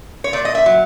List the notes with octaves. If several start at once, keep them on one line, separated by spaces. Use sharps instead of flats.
C#5
A#2 D5
D#5
E5
F#3